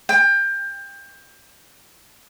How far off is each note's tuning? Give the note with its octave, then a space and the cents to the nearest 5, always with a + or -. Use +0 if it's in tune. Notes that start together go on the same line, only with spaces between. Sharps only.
G5 +25